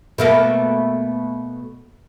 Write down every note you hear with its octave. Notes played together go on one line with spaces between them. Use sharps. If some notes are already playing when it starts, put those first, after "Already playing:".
B2 A3 A#3